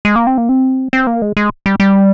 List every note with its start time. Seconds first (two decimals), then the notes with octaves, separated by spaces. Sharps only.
0.05 G#3
0.16 A#3
0.27 C4
0.38 A#3
0.49 C4
0.93 C4
1.07 A#3
1.22 G#3
1.37 G#3
1.66 G3
1.80 G3